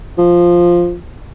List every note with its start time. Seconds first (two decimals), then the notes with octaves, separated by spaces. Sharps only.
0.18 F3